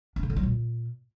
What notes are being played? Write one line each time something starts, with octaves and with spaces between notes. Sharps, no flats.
D4
C#3
D3
F#3
A#2